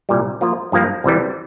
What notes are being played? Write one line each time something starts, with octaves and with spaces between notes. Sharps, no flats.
C2 A#2 G3
F3 A#3 F4
G2 F3 A#3
C2 C3 E3 G3